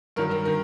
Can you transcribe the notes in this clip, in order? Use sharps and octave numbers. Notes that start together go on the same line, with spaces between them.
G2 D#3 F#3 A#4
A#4
D#3 A#4